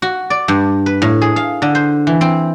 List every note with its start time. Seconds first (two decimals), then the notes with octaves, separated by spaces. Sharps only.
0.02 F#4
0.30 D5
0.48 G2
0.86 B4
1.02 A2
1.22 G#4
1.36 F5
1.62 D3
1.75 C5
2.07 E3
2.21 C4